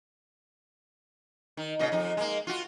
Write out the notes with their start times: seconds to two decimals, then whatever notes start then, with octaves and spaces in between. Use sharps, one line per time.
1.57 D#3
1.79 A#2 C#3 D#5
1.92 F2 D#4
2.17 G#3 A#3
2.47 F4 F#4